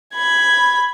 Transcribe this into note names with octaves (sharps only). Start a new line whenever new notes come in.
B5 G#6